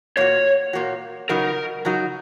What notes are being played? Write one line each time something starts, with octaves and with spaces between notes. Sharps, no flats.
A#2 A#3 F#4 C#5
A#2 A#3 F#4
C#3 F#3 D#4 F#4 A#4
C#3 F#3 D#4 F#4